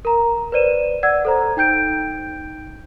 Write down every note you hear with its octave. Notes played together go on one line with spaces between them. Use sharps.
A#4 A#5
B4 C5 D5 D#7 E7
D5 F#5 E6 G#6
A4 C5 A#5
D#4 G5 G6 D7